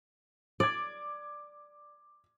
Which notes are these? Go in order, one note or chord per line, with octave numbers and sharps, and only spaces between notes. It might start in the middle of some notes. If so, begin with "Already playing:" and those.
D5 D6 G#6